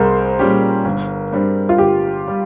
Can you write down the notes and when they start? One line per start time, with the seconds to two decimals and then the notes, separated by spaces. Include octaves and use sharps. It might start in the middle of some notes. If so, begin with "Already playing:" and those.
Already playing: C2 G#4 A#4 C5
0.39 A#2 G3 C#4 G4
0.85 G1
1.32 G2 G3 C4
1.69 F4
1.78 G1 G4
2.28 G3